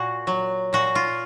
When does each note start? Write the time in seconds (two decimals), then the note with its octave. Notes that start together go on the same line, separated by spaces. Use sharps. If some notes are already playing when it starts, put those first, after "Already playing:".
Already playing: A#2 F#4
0.27 F#3
0.73 A#2 F#4
0.95 F4